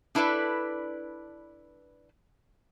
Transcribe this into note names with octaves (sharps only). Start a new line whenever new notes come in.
D4 E4 A4 B4 D5